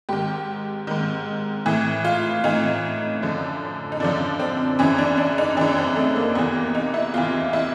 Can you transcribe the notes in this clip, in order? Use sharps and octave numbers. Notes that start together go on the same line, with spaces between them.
G#2 D#3 G4
G#2 D#3
A2 E3
F4
A2 E3 D#4
F#2 D3 F3
D#4
F#2 D3 F3 D4
C4
F#2 C#3 E3 C#4
D4
D4
D#4
F#2 C#3 E3 D4
C4
A3
A#3
E2 C3 E3 B3
A#3
D#4
E4
E2 C3 E3 F4
E4